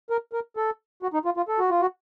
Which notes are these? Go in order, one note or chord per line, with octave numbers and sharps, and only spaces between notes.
A#4
A#4
A4
F#4
D#4
F4
F4
A4
F#4
F4
F#4